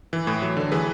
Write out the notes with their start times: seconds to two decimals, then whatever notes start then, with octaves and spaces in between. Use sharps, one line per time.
0.13 E3
0.27 A2
0.42 F#3
0.57 D3
0.72 E3 G#4 B4